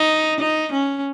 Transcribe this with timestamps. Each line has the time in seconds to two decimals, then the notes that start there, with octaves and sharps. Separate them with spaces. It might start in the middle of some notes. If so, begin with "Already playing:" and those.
Already playing: D#4
0.40 D#4
0.72 C#4